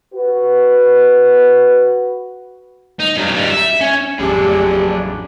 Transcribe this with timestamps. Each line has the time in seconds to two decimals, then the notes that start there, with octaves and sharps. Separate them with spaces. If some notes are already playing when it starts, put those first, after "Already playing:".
0.14 F#4 B4
3.00 D#4
3.16 G2 F#3
3.34 G3 D#4
3.50 E5
3.81 C#4
4.19 A1 F2 F#3 D4 G4 G#4